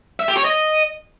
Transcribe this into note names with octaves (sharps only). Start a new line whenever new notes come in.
E5
G4
C#5
D#5